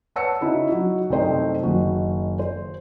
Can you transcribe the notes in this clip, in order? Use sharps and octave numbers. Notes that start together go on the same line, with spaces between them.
B4 C#5 F#5 A5 E6 C#7
C#3 D#4 E4 F#4
F#3 D#4 F#4
C2 F#2 A3 D#4 C5 G5
F#1 D#3 F#4
C5